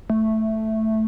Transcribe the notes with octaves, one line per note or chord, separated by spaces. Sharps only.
A3